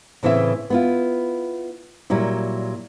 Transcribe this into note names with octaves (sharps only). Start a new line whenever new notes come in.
A2 C#3 E3 C4 E5
B3 E4 F4
A#2 F#3 G3 E4